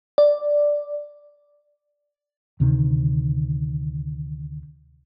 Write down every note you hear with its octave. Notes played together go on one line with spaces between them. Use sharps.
D5
D2 C3 D#3